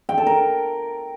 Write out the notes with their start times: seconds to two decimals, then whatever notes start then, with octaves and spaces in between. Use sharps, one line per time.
0.09 G5
0.18 A4
0.27 A#4